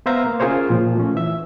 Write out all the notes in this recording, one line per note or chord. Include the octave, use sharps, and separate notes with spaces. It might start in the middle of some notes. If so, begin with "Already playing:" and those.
B3 B4 C5 E5 F5 A#5
A#3
C#4 F4 G#4 A#4 C5 C#5
A#2 F3
A3 C#4
E3 E5